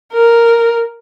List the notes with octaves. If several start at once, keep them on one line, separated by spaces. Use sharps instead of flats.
A#4